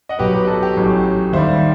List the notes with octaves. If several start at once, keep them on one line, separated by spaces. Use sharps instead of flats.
D#5 F#5
B1 B2 F#3 G4 B4
G4 B4
F#4 A4
G4
A1 A2 F#3
D#2 D#3 G3 C5 E5